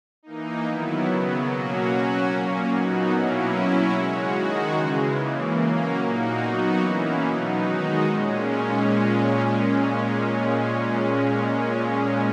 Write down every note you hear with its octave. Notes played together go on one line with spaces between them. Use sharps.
E3 A#3 D#4
D#3 F#3 B3 E4
C#3 F#3 B3
B2 F#3 A#3 C#4 F#4
F#3 C#4 F#4
A#2 A#3 C#4
F#3 B3 D#4 F#4
B2 F#3 A#3 C#4 E4
F#3 C#4 E4
C#3 G#3 C#4 F#4
D#3 G#3 D#4 F#4
C#3 E3 G#3
C#3 E3 A#3
F#3 A#3 C#4
A#2 A#3 D#4 F#4
F#3 B3 D#4 F#4
E3 A#3 C#4 E4
B2 F#3 B3 D#4
D#3 G#3 D#4 F#4
A#2 G#3 C#4